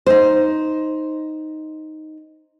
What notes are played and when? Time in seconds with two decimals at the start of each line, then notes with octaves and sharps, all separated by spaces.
0.06 D#4 C5